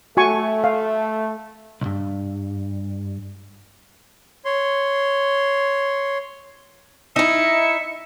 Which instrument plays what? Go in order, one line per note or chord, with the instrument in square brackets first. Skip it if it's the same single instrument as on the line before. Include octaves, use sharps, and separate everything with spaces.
[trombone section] A3 [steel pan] F#4 G#5 C#6
[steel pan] F5
[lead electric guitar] B1 G2
[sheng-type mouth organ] C#5 C6
[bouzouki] D#4 E4 [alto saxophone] E5 [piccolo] C#7